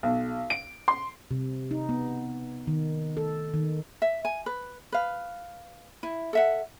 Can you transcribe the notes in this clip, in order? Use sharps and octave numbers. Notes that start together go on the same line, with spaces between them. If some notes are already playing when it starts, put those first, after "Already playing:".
B1
D7
C6
C3
D#4
B3
D#3
A4
D#3
E5
G#5
B4
B4 F5
E4
A4 E5 F#5